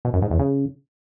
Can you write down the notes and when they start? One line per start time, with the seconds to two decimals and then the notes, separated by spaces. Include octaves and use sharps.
0.05 B2
0.13 F#2
0.22 G#2
0.31 E2
0.39 C#3